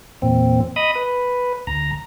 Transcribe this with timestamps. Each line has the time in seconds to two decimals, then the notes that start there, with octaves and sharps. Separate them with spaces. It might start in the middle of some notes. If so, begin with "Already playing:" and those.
0.22 E2 A#2 C4
0.76 D#5 B5 D#6
0.95 B4
1.67 D2 A#5